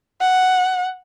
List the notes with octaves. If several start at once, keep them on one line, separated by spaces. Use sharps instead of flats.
F#5